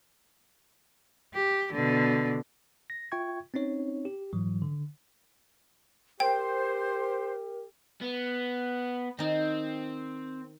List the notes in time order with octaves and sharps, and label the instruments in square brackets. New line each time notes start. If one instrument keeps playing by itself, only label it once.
[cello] G4
B2 D3
[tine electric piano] A#6
F4 E5 G5 C#6 G#6
C4 C#4 D#4 C#5
G4
G#2 E3 F#3
D3
[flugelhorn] G4 [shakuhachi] A#4 [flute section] C5 [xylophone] G5
[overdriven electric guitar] B3
[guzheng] D#3 D#4 [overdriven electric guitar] C4